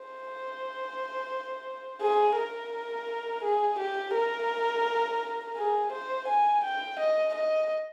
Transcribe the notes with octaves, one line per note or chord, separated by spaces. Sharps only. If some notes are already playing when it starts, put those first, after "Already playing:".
Already playing: C5
G#4
A#4
G#4
G4
A#4
G#4
C5
G#5
G5
D#5
D#5